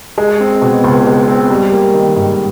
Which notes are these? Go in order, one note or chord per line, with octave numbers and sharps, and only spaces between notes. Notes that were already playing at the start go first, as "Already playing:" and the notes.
G#3
C4
B2
C#2
G#3
C4
G3
A#3
D#3
G#2